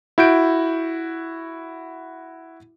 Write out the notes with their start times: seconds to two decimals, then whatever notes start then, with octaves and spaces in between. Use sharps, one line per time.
0.18 E4 F#4 G6 D7